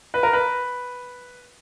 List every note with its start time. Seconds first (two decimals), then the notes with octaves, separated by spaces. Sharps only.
0.14 B4
0.23 A#4
0.33 B4